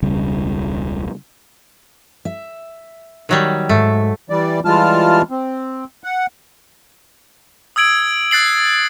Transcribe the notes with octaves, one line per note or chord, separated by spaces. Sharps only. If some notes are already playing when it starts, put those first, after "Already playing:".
E1 C#2 C#3 G3
E5
D#3 F#3 G3
G#2 A3
E3 G3 D5
E3 G3 G#3 F4 A5 F6
C4
F#5
D#6 E6 G#6 D7 F#7
F#6 A6 C7 F#7